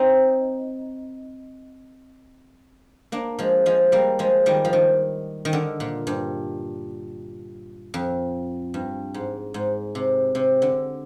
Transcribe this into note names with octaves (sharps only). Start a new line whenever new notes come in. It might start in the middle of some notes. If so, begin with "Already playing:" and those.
Already playing: C4 D#4
A#3 D4
F3 G#3
F3 G#3
G3 A#3
F3 G#3
D#3 G3
F3
D#3
D#3
D3
A#2
G2
F2
G2
G#2
G#2
C3
C3
D3